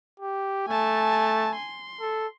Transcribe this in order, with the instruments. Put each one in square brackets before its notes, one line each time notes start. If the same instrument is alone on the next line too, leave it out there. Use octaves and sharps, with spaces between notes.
[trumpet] G4
[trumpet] A3 [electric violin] G#5 A5
[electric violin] C6
[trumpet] A4